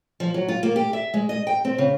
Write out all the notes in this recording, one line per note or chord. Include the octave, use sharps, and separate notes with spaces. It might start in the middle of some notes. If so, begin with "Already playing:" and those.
F3
F#3
F4
A#3
G4
E5
G#3
D#5
G5
C4
C#3